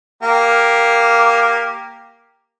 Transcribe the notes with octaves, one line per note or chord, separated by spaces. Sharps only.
A#3 G4